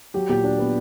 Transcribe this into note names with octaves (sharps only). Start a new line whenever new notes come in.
F#3 G4
A#2 G4
D4
B3